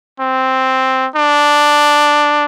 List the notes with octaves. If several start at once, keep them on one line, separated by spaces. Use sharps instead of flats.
C4
D4